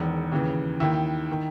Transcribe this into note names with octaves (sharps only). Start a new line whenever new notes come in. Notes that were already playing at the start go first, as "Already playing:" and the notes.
Already playing: E1 E2 D#3
D#2 C#3 E3
D#2 D#3 E4
D#3